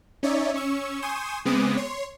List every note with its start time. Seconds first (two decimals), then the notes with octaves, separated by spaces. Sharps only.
0.23 C#4 D#4 C#5 D5 E5
0.54 C#4 C#6 E6
1.02 G#5 C6 C#6 D#6 G6 E7
1.45 C#3 G#3 B3 C4 D6 D#6
1.77 C#5 C6